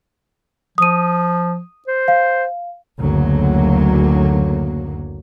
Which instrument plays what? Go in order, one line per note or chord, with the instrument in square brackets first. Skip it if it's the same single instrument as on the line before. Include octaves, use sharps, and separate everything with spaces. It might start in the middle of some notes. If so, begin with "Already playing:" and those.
[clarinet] F3 [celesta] D#6 D#7
[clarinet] C5
[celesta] F5
[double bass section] F#1 D2 F#3 A#3